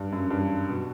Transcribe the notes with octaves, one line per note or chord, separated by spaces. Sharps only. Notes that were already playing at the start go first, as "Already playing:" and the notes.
Already playing: G2
F#2
G2
B2